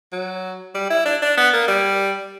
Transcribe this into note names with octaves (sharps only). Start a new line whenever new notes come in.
F#3
G3
E4
D4
D4
B3
A#3
G3